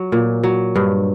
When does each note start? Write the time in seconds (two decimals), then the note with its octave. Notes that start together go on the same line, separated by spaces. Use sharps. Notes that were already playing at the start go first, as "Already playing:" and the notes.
Already playing: F#3
0.12 A#2
0.43 F#3
0.76 G2